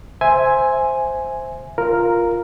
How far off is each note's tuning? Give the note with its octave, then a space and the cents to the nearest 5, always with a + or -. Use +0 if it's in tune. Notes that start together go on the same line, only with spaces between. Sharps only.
C5 +0 E5 +0 G#5 +0
F4 +0 A#4 +0